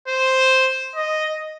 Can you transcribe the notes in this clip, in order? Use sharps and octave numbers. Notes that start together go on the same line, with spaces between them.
C5
D#5